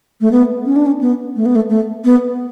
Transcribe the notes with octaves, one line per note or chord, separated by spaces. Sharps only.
A3
B3
C#4
D4
C#4
B3
A3
B3
A3
A3
B3